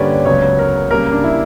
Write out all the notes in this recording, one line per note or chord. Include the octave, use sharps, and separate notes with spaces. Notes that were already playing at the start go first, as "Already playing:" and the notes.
Already playing: G2 D3 A#3 C#4 G4 B4 C#5 D5
C#2 C#3 F#3 B3 C#5
A#4
C#3 G3 A#3 A#4
D4
E4